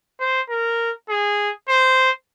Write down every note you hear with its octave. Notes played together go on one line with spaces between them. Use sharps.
C5
A#4
G#4
C5